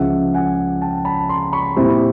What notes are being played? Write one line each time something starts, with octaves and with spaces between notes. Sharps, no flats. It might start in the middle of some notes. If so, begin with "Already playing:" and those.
Already playing: C#2 C#3 F3 E5 F#5
F#5 G#5
G5 A5
A5 B5
A#5 C6
B5 C#6
A#2 G3 C4 E4